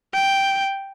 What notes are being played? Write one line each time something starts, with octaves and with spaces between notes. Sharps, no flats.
G5